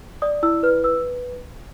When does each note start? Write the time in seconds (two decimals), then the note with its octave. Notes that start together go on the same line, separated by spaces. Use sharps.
0.22 D5 D#6
0.43 E4 E6
0.63 B4 F6
0.84 B4 E6